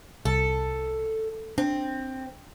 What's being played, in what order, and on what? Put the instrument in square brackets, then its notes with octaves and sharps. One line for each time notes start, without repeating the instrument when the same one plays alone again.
[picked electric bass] C2 [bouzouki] A4
[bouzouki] C4 [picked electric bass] D4